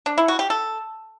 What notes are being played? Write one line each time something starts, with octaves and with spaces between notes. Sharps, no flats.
D4
E4
F#4
G4
A4